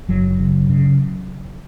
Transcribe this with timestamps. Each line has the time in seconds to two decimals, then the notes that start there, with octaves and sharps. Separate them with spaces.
0.08 F#1 F#3
0.39 C#3
0.70 C#3